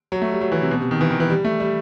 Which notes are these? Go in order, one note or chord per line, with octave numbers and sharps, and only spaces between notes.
F#3
A3
G3
F#3
E3
C3
B2
C3
D#3
E3
D#3
E3
G3
A3
G3